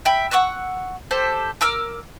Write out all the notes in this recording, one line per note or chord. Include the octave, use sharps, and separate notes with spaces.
E5 G5 B5
F#5 C#6 E6 F#6
G4 A4 C5
A#4 D6 E6 F6